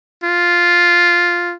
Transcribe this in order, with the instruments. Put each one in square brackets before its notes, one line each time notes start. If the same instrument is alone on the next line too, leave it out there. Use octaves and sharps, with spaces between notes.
[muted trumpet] F4